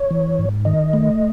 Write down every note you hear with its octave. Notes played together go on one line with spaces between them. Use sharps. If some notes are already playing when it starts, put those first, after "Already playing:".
Already playing: C#5
E3
G#2
D#3 D#5
A3